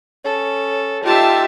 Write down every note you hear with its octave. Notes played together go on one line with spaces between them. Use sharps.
C#4 A4
D#4 F4 G4 E5 A5